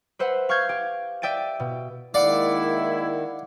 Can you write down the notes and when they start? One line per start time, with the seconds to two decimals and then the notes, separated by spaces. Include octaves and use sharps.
0.19 B4 C5 E5 F#5
0.49 F5 C#6 F6 G6 G#6
0.69 G4
1.22 D5 E5 G5 A6 D#7
1.60 B2
2.14 D#3 G#3 A#3 E4 D5 F5 F#5 D6